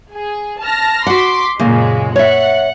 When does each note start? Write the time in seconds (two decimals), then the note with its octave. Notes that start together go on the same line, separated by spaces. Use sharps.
0.13 G#4
0.61 A5 F6 A#6
1.07 F#4 F#5 C6 D6 B6
1.59 F#2 A#2 C#3 G#3 A#3
2.16 C#5 E5 F#5